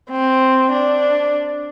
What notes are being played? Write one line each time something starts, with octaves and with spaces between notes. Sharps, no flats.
C4
D4